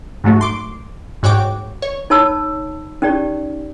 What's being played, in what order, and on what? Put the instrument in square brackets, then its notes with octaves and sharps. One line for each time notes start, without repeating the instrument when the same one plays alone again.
[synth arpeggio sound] G#2 F#3 A3 F#4
C6 D6
G#2 F#4 C#5 G5 D6
C#5
[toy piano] D#4 C#5 A5 B5 E6
C#4 D#4 G4 D5